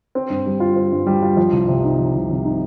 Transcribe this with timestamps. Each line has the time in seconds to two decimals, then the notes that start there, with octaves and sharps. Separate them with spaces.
0.15 C4
0.30 G2
0.46 G3
0.60 F4
0.76 C4
0.92 G2
1.07 G3
1.22 F4
1.37 F3
1.52 C2
1.68 C3
1.84 D#4
1.99 F3
2.15 C2
2.30 C3
2.45 D#4